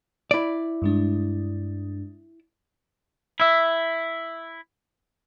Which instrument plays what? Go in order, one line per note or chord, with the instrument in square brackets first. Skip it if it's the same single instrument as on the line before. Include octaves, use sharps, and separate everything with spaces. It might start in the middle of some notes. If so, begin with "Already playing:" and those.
[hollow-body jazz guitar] E4 D5
[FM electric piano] G2 G#3 D4
[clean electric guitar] E4 E5